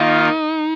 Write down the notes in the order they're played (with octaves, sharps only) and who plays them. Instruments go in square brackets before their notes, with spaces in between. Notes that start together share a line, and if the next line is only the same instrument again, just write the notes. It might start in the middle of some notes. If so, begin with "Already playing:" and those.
Already playing: [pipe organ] D#3 A#3 F4 [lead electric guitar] D#4